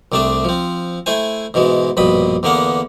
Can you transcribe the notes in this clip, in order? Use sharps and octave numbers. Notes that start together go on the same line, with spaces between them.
C2 C3 A3 D4 A5
F3 C4
A3 E4 C5 G#5
G#2 B2 E3 G#3
A#1 G2 B2 B5 D#6
E2 D3 A#3 B3 F#5